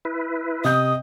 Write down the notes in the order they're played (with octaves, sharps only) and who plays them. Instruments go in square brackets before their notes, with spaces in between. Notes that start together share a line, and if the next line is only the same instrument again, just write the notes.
[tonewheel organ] E4 B4
[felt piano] C3 G6 [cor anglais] D#5 [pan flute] D#6